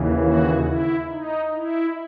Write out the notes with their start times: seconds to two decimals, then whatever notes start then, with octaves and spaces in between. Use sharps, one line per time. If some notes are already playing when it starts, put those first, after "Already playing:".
Already playing: D#2 C#3 E3
0.19 F#4
0.64 E4
1.09 D#4
1.55 E4